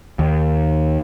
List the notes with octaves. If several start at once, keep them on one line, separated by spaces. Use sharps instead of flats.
D#2